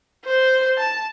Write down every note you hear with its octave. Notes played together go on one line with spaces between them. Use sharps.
C5
A5